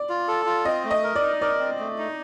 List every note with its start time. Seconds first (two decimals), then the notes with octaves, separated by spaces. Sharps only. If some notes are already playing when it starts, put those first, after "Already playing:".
Already playing: D5
0.09 F4
0.28 A4
0.46 F4
0.65 C4 D#5
0.84 A3
0.91 D#5
1.03 A#4
1.15 D5
1.22 D#4
1.41 A#4 D5
1.59 C4
1.79 A3
1.98 D#4